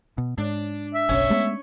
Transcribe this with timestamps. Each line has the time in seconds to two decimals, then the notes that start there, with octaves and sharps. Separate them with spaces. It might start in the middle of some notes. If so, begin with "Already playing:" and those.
0.18 B2
0.38 G#2 D4
0.94 E5
1.09 F#1 B1 C#4
1.30 G#3 A3 B3